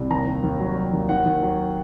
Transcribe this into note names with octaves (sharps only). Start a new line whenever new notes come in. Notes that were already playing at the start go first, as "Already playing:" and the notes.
Already playing: C2
D#2 A#5
D#2
D#2
F#3
F#3
D#2
D#3 F#5
D#2
F#3